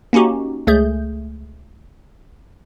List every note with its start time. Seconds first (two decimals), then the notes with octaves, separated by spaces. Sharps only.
0.13 A#3 C#4 D#4 F#4 G4
0.67 C#2 A3 G#4 G6